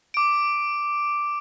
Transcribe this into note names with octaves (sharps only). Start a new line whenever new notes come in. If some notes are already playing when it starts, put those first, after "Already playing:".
D6 D7